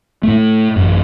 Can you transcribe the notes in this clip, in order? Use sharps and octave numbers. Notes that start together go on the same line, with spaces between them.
A2 A3
A1 F#2